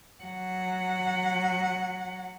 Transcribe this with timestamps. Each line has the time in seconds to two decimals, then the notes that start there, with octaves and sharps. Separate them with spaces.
0.24 F#3 F#5